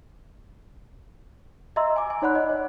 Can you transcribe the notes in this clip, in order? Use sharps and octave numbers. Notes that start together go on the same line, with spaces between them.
D#5 E5 A#5 C6 E6
G#5 D6
G#5
D#4 C#5 D5 F#5 B5 F#6
D#5
C#5